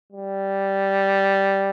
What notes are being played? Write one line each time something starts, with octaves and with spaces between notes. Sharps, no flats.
G3